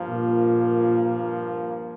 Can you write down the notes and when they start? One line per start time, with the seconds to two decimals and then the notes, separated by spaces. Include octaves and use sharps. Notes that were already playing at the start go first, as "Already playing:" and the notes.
Already playing: G2 F3 A#3
0.10 A#2